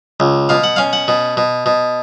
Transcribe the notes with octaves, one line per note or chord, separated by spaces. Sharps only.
C#2
B2 F5
F#5
C#4 F5
F#5
B2
B2
B2